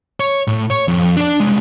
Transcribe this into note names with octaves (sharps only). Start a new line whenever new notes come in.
C#5
A2
C#5
F2
D4 D5
C2 G#3